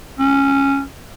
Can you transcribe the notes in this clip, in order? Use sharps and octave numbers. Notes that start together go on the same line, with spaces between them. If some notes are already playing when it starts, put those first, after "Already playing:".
C#4